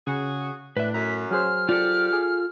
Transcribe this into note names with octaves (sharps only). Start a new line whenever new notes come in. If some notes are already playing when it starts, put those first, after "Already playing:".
C#3 F#4 G#4
A2 D4 B4 E5 F#6
F#2 A#5 B6
F#3 G#4 C5 F6
F4 G4 A4 D5
G#4